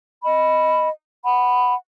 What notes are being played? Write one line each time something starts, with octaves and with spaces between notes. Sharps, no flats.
D#5 B5
F#5 B5